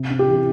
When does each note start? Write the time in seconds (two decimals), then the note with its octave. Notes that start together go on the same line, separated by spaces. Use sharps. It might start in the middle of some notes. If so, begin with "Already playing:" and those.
Already playing: C3
0.10 C3
0.19 G4
0.28 E3